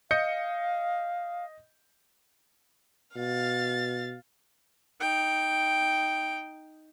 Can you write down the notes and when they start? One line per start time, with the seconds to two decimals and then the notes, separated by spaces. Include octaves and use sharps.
0.11 D#5 F5 G6 C#7
3.16 B2 F5 A6
5.01 D#4 G5